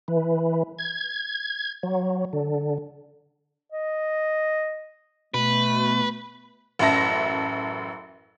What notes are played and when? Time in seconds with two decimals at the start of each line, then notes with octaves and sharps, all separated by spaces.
0.08 E3
0.78 G#6
1.83 F#3
2.33 D3
3.72 D#5
5.34 B2 A3 B4
6.79 A1 F#2 E5 A5 A#6